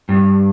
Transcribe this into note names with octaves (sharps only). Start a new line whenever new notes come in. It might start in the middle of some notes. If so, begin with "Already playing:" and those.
G2